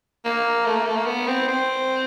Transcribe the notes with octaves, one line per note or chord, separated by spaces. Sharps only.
A#3
A3
A#3
A3
A#3
B3
C4
C4